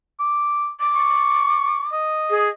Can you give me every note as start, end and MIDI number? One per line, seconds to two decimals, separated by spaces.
0.20 0.71 86
0.80 1.90 86
0.95 1.84 85
1.92 2.54 75
2.30 2.49 68